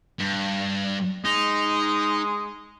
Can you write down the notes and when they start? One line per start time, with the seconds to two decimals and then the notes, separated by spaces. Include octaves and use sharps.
0.19 G2
1.25 G#3 D#4